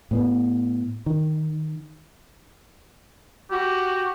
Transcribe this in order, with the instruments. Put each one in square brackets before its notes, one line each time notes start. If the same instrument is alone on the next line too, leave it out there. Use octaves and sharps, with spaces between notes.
[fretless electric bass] A2 B3
D#3
[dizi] F#4 [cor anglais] G4